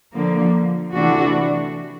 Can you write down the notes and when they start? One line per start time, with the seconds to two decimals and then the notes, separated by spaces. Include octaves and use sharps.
0.14 D3 F3 A#3
0.94 C3 E3 A3 D4 F#4